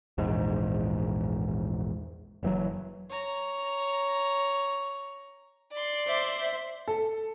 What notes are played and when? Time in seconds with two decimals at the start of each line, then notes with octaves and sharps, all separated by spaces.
0.18 A#1 E2 G#2
2.43 F#1 E3 F#3
3.09 C#5 A#5
5.72 D5 C6
6.07 C5 E5
6.88 A4